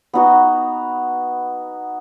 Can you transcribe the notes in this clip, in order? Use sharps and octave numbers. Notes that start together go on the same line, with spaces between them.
B3 D#4 F#4